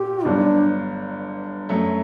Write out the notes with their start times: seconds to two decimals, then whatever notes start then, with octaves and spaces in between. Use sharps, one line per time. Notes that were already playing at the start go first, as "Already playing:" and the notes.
Already playing: A#2 G4
0.25 G1 G2 D3 F#3 D4
1.69 F#2 F#3 A3